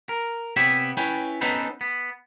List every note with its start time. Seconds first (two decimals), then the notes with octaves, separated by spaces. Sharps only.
0.09 A#4
0.56 C3 B3 G4 C#5 E5
0.97 C#4 E4 B4 C#5 G5
1.41 B3 C#4 D#4 A4 B4 C5
1.81 B3